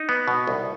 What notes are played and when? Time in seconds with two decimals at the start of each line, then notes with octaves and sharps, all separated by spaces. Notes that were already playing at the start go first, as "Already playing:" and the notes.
Already playing: D#4
0.09 B3
0.28 B2
0.47 C2